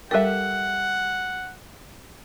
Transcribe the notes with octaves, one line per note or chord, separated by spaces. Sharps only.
G3 G4 A4 A#4 E5 F#5